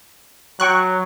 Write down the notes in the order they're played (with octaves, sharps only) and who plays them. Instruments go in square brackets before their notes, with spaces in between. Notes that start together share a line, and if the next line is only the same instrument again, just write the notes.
[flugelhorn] F#3 [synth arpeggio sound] G5 C#6 F#6